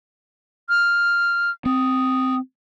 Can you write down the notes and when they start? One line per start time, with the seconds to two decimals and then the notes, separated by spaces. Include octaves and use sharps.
0.69 F6
1.66 C4 D#6